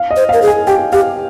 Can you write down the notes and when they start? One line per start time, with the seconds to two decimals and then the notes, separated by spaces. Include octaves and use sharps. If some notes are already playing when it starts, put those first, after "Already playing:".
Already playing: F5
0.11 D#5
0.16 C5
0.29 A#4 F5
0.42 G#4
0.48 G#5
0.67 G4 G5
0.92 G4 F5